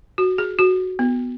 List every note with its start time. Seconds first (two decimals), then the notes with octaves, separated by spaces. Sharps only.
0.18 F#4
0.38 G#4
0.59 F#4
0.99 B3